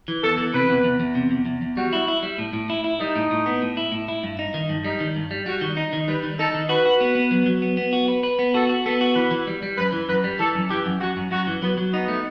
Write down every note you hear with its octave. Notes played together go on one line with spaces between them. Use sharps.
E3
E2 A4
E3
C3 B4
E2
E2
E2
C3
E2
E2
E2
G3 F#4
E4
E4
G3
A2
A2
E4
E4
G3 D#4
A2
A2
B3
A2
E4
A2
E4
G2
D#4
D#3
G2
G3 D#4
D#3
G2
G3
G3 F#4
D#3
D#4
D#3
G3 B4
D#3
D#4 A4
D#3
F#4 B4
F#4
B3
B3
F#3
F#3
B3
B3
F#4
B4
B4
B3
F#4 A4
F#4
B3 A4
F#4
E3 B4
E3
G3
G3
F#2 B4
E3
F#2 B4
G3
E3 A4
F#2
E3 G4
F#2
F#2 F#4
F#2
F#2 F#4
E3
F#3 B3
F#3
B3 D#4
A3